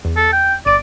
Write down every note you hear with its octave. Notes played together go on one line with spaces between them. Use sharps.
E2
A4
G5
G1 D5 D7